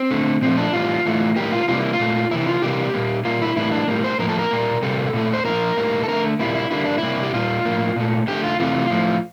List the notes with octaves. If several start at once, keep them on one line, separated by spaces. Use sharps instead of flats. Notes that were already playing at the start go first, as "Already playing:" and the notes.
Already playing: C4
D3 A3
A#2 F3 A3 C4
D4
A2 E3 G3 F4
A2 E3 A3
A2 G3 A#3 G4
F4
C3 G3 A#3 F4
E4
F4
A#2 A3
C3 E3 A#3 E4
F4
C3 E3 G3 A#3 G4
A#2 G3 A#3
A#2 G3 A#3 F4
E4
A2 E3 G3 A#3 E4
D4
A2 G3 A#3
C5
A2 F3 A#3 A#4
A4
A#4
A#2 G3 A#3
C3 G3 A#3 A4
A#2 A3
C5
A#2 F3 A#3 A#4
A2 G3 A#3
A4
D3 A3 A#4
A#2 G3 A#3 E4
E4
D3 G3 A#3 E4
D4
C3 G3 A#3 E4
G4
A#2 G3 A#3 F4
A2 F3 A#3
A#2 A3
D3 A3 G4
F4
C3 E3 A3 F4
A2 F3 A3